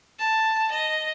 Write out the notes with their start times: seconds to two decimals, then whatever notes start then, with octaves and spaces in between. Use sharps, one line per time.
0.19 A5
0.71 D#5